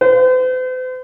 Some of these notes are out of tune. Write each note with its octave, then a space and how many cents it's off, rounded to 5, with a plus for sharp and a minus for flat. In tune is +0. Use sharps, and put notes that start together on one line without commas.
C5 -45